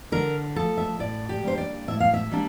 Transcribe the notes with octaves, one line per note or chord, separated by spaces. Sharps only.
D3 A#4
F3 A3 A4
E5
A2 D5
G4
G3 A#3 D4 C5
D5
A2 E5
F5
E5
G3 A#3 D4